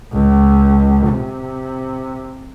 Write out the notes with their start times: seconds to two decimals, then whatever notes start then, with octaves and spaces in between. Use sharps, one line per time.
0.13 C#2
1.08 C3